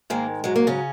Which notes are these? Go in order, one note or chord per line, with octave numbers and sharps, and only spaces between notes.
G#2 D#3 G#3 A#3
G#2 F#3 G#3
A#3
C#3 C#4